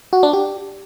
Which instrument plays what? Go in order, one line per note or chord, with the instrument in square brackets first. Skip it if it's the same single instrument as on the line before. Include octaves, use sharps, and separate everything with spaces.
[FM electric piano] F#4
D4
G4